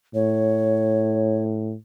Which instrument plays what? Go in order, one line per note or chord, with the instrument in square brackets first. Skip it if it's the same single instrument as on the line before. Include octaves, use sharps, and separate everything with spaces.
[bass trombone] A2 [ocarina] C#5